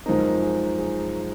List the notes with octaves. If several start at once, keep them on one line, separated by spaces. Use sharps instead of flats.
F#2 F3 G#3 C4 D#4 A#4
G#4
G#4